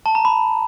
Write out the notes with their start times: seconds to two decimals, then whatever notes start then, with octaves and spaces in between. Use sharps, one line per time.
0.06 A5
0.15 A#5
0.25 B5